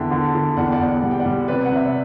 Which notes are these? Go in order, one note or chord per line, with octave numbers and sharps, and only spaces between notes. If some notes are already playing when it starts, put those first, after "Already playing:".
Already playing: E2 D3 E5 G5
D3
D3
E2 D5 F#5
G5
D5 F#5
E2
D5 F#5
G3 F#5
G5
D5 F#5
G3
C3 B4 D5
F#5
C3 E5
D5